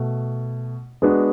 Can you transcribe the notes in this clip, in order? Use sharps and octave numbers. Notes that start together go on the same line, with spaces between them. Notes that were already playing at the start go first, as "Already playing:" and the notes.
Already playing: B2 A3
G#3 B3 D4 F#4